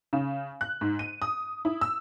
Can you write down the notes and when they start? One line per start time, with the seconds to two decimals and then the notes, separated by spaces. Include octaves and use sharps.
0.13 C#3
0.61 F#6
0.81 G#2
0.99 D#7
1.22 D#6
1.65 E4
1.81 E6